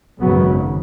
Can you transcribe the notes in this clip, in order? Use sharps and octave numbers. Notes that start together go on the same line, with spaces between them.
G#1 F#2 C#3 F#3 B3